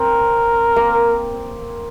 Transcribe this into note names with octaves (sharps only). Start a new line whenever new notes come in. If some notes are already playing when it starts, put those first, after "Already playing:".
Already playing: C4 A#4
A#3